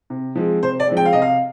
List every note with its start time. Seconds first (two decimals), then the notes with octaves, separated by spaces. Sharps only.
0.10 C3
0.35 F3 G#3 C4
0.62 C3 C5
0.80 D5
0.88 F3 G#3 C4
0.97 G5
1.05 F5
1.13 C3 D#5
1.22 F5